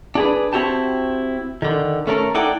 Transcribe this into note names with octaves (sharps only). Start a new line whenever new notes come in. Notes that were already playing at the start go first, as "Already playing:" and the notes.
D4 G#4 B4
C4 C#4 E4 F#4 G4 A5
D3 D#3
A3 C#4 A4 A#4
D#4 E4 A4 D5 F#5 G5